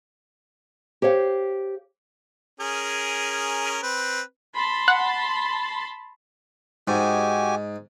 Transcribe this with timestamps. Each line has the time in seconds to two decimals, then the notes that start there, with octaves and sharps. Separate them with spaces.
1.02 G4 C5 C#5 F5
2.60 C#4 G#4 A#4
3.83 C4 B4
4.57 A5 B5 C6
4.88 F#5
6.88 G#2 F#4 G4 G#5